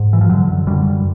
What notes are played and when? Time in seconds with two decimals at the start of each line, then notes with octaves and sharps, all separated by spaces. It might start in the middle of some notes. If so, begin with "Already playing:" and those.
Already playing: G#2
0.13 E3
0.21 F3
0.29 F#2 D3 F#3
0.67 F#2 D3 G3